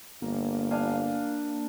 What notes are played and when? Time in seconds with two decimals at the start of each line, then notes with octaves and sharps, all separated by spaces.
0.22 G1 A#3
0.71 D4 F5 G#5